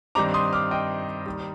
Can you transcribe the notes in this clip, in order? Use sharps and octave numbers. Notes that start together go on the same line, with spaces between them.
G2 D#3 G3 C4 D#4 A#5 D6
C6 D#6
D6 F6
D#5 G5
D#2 D#3 G3